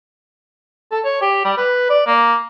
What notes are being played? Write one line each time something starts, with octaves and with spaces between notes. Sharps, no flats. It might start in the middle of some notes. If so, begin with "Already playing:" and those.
A4
C#5
G4
G3
B4
D5
A#3